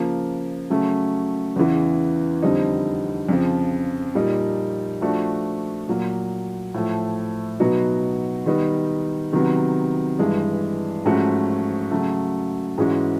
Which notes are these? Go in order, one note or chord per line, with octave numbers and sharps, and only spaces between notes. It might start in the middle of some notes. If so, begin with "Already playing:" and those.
Already playing: C#3 F3 A#3
C#3 F#3 A3 C#4
E2 C#3 E3
F2 D3 G3 C4 D#4
F2 C#3 F3
A#2 G3 A#3 D#4
F3 A3 D4 F#4
A#2 F#3 A#3
A2 F3 A3
B2 F#3 B3 D#4 F#4
D#3 G3 B3 D#4
C3 D#3 F#3 B3
G2 E3 G#3
G#2 F3 A3 C#4 F#4
C#3 F#3 A3
G#2 E3 G#3 C#4 F#4